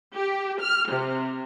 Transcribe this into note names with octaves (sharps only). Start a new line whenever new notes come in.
G4
F6
C3